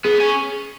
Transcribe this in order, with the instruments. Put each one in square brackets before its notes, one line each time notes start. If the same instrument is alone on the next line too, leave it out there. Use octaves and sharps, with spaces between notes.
[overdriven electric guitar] B3 [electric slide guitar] G#4
[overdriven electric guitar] C#4